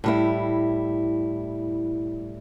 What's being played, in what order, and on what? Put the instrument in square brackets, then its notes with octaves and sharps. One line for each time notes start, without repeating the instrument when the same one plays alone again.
[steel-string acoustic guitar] A2 G3 E4